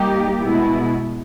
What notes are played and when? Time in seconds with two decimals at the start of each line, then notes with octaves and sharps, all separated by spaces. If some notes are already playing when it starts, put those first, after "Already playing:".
Already playing: G3 A#3 D#4 G4
0.40 B2 G#3 B3 E4